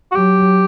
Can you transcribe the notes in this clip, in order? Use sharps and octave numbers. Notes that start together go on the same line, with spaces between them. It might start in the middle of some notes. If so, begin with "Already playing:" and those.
F#4
F#3 G4